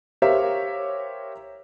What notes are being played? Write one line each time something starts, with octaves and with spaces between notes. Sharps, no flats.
G4 A#4 C5 C#5 E5 F5